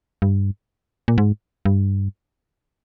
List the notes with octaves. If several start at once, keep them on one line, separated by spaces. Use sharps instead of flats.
G2
A#2
G#2
G2